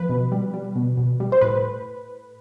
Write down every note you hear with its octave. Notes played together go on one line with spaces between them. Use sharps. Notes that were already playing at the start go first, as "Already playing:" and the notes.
Already playing: F3 B4
B2
G3
G3
B2
B2
G3
C5
A2 B4